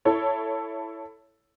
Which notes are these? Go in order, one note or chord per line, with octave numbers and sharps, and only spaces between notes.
E4 A4 C#5